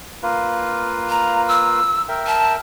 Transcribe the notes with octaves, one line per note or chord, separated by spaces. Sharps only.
A#3 F4 B4
A#5
E6
A#4 E5 G5
A5